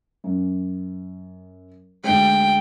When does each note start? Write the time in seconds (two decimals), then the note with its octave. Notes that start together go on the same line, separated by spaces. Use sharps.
0.24 F#2
2.04 D2 G#3 G5